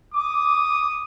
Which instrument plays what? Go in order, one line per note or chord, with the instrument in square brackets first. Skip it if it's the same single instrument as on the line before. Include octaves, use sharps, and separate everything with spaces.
[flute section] D6 [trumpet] D#6